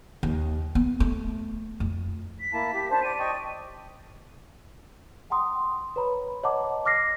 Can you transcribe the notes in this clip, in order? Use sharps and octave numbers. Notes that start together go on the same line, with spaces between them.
D#2
B3
A3
F2
B6
A#3 E4 A5
G4
D4 C5 A5
D5 D#7
D#5 G5 C#6
F#5 G5 A#5 C6 D#6
B4 C#5 A#5 B5
C#5 D#5 F#5 A5 A#5 D6
D#5 D6 F6 A#6 C7